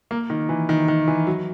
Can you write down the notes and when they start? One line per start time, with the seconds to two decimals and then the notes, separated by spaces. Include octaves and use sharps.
0.11 A#3
0.30 D#3
0.49 E3
0.69 D#3
0.88 D#3
1.08 E3
1.27 F#3